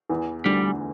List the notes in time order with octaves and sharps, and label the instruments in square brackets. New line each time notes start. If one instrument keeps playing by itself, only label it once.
[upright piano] E2 E3
[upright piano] D2 D3 [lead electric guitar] G3